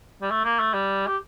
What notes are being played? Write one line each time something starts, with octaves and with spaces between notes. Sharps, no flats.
G3
A3
A#3
A3
G3
G4